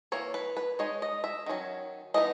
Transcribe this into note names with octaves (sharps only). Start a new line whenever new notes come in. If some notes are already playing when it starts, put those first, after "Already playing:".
E3 A#3 C#5
B4
B4
G#3 D#4 C#5
D#5
E5
D#3 F#3 C#4
E3 B3 D#4 D#5